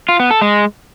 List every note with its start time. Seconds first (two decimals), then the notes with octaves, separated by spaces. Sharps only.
0.09 F4
0.20 B3
0.31 A4
0.42 G#3